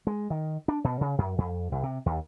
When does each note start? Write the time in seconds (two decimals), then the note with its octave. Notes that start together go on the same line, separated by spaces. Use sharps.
0.07 G#3
0.30 D#3
0.68 D4
0.84 B2
1.01 C#3
1.18 F#2
1.38 F2
1.72 C2
1.83 C3
2.06 D#2